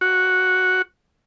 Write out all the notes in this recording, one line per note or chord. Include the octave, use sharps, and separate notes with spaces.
F#4